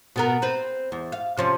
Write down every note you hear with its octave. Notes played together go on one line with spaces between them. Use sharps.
B2 B3 A#4
C4 B4
E2
F5
C3 F3 C#4